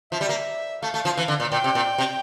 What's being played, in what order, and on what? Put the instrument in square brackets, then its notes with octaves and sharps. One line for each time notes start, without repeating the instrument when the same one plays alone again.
[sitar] F3 [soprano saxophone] E5
[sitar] G3
A#3
[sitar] A3 [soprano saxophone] F5
[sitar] A3
F3
E3
D3
A#2
[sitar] A#2 [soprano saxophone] G5
[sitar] C3
A#2
C3